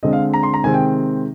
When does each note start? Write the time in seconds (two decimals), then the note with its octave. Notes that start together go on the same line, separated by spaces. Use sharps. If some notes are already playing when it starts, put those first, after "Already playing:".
0.03 D3 G#3 C4 D#5
0.13 F5
0.34 A#5
0.43 C6
0.54 A#5
0.64 C3 D#3 G#3 C4 G#5
0.74 G5